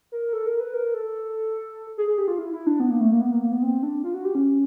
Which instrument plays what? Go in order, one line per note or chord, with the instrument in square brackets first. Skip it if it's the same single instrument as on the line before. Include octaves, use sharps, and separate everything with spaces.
[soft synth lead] A#4
A4
A#4
B4
A#4
A4
G#4
G#4
G4
F4
E4
E4
D4
B3
A#3
A3
A#3
B3
A#3
A#3
B3
C4
D4
F4
F#4
G4
C#4